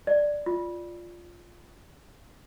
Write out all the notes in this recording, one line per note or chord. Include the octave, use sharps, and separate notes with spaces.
D5
F4